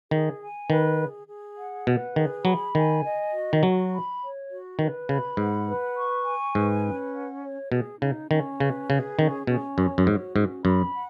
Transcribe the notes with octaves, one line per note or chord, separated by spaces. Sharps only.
D#3 G#4
G#5
D#3 B4
G#4
G#4
F#5
B2 B4
D#3 G#4
F#3 B5
D#3 G#5
D#5
F#4
D#3
F#3 F#4
B5
C#5
F#4
D#3 B4
C#3 B5
G#2 F#5
B4
C#6
G#5
G#2 B4
C#4
F#5
C#5
B2 G#4
C#3 D#4
D#3 C#4
C#3 B4
C#3 G#4
D#3 C#4
B2 C#4
F#2 C#5
F#2
G#2 F#4
G#2 C#4
F#2 B5
F#5